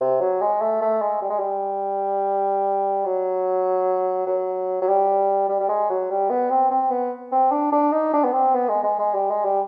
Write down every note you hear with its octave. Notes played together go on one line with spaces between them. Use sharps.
C3
F#3
G#3
A3
A3
G#3
G3
G#3
G3
F#3
F#3
F#3
G3
G3
G3
G#3
F#3
G3
B3
C4
C4
B3
C4
D4
D4
D#4
D4
B3
C4
B3
G#3
G#3
G#3
G3
G#3
G3